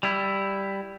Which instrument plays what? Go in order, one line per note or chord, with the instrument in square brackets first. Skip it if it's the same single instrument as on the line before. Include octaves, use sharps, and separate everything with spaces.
[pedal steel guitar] G3 E4